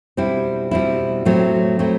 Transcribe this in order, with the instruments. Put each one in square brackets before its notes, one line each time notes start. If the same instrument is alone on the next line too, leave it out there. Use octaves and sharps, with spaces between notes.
[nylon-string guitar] B2 G3 C4 E4
B2 G3 C4 E4
A2 F#3 A3 C4
A2 F#3 A3 C4